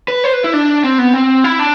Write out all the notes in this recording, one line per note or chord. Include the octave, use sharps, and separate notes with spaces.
B4
C5
B4
E4
D4
C4
B3
C4
E4
D4